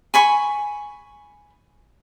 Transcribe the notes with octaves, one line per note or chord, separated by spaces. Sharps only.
G#5 B5 C#6